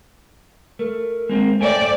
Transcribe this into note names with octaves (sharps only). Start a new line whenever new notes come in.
A3 A#4
G#3 A#3 C4
A3 A#4 C5 D5 G5 G#5